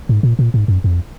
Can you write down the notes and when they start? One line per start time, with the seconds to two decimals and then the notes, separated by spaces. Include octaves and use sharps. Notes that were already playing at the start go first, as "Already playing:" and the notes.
0.09 G#2
0.23 A#2
0.39 A#2
0.54 G#2
0.68 F#2
0.84 F2